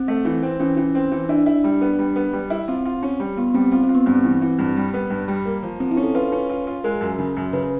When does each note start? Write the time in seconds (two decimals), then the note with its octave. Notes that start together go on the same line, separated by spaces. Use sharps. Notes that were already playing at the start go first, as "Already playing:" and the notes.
Already playing: C4
0.08 A3
0.25 E3
0.43 C4
0.60 E3 C#4
0.77 E3
0.95 C4
1.12 E3
1.29 D4 E4
1.46 E4
1.64 G3
1.81 B3
1.99 G3
2.16 B3
2.33 G3
2.50 E4
2.68 C4 F4
2.85 F4
3.03 C#4
3.20 G3
3.37 B3 F4
3.54 G3 C4
3.72 C4 F4
3.83 C4
3.89 F4
3.95 B3
4.06 G2 C4
4.24 E3
4.41 E3
4.59 G2
4.76 G3
4.94 B3
5.10 G2
5.28 G3
5.45 A#3
5.63 F3
5.80 F3 C4
5.91 E4
5.97 C#4
6.03 A4
6.15 F4 B4
6.32 C#4
6.49 F4
6.67 F4
6.84 G#3 A#4
7.01 F#2
7.18 C#3
7.37 F#2
7.53 C#3 B4